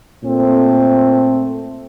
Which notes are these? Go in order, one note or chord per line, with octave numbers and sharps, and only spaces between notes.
A#2 A3 C4